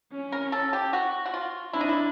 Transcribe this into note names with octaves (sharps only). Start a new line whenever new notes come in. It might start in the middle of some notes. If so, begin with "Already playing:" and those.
C#4
A#4
A4
G4
F#4
F#4
F4
D4 E4
D#4
E4